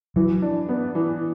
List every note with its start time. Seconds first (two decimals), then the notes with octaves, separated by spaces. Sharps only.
0.16 E3 F#3
0.42 D4
0.69 B3
0.95 E3